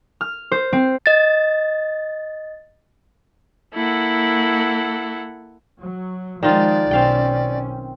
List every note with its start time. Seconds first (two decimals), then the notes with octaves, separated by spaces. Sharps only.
0.21 F6
0.52 C5
0.73 C4
1.06 D#5 A6
3.75 A#3 E4 A4 F#5
5.82 F#3
6.43 D#3 F3 G#3 F4 D5
6.91 B1 C4 C#4 F5 G5